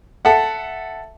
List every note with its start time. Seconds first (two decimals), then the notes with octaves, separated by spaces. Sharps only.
0.25 A4 E5 F#5